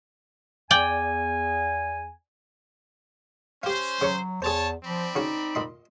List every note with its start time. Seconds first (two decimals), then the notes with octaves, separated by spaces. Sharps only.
0.71 E2 D5 G5 G#5
3.63 C#4 G4 C5 F5
4.01 C#3 F#3 C#5 C#6
4.42 E2 G#4 C5 C#5 A5
4.84 F3 C4 D5 B5
5.16 C#3 D#4 F#4 F#5
5.55 A#2 D#5 C6